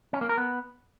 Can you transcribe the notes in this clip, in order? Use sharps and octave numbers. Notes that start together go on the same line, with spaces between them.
C#4
A#3
A#4
B3